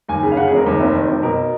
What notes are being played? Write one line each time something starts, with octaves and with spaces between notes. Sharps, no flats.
D#2 G#5
C#3
F5
C#3 F#5
G#4
F1
A#4
D#2
F1
D#3
F1
B2 A#4